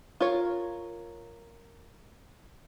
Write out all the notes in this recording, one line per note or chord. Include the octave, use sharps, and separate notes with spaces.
F4 A#4 C#5